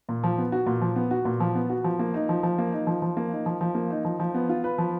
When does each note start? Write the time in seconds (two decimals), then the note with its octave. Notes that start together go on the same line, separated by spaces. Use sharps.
0.09 A#2
0.24 F3
0.38 B3
0.52 F#4
0.66 A#2
0.81 F3
0.96 B3
1.11 F#4
1.25 A#2
1.40 F3
1.55 B3
1.70 F#4
1.84 F3
1.99 A#3
2.14 D#4
2.29 F3
2.43 F3
2.58 A#3
2.72 D#4
2.87 F3
3.02 F3
3.17 A#3
3.32 D#4
3.46 F3
3.61 F3
3.75 A#3
3.90 D#4
4.05 F3
4.19 F3
4.34 B3
4.49 F4
4.64 B4
4.78 F3